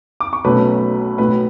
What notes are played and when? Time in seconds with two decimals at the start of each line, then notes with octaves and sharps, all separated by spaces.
0.20 D6
0.33 C#6
0.45 B1 B2 A3 C#4 B4 B5
1.18 B1 A2 F#3 B4 B5